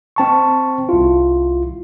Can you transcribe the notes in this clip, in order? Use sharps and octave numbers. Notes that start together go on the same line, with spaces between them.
C4 A5 C#6
C2 E4 F4